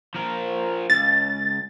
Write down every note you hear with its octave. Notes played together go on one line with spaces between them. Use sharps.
F3 A#4
C#2 A6